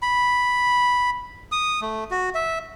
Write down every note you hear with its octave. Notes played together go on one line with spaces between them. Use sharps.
B5
D#6
A3
F#4
E5